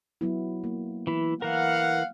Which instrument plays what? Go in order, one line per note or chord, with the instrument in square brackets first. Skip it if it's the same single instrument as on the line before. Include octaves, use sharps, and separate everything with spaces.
[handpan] F#3 B3 E4
A#3
[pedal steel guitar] E3 E4 [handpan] B3
[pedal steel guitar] E3 A#4 [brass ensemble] F5 F#5